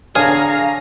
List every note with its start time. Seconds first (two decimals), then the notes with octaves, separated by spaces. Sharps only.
0.15 D3 G#4 C#5 F5 A#5 F6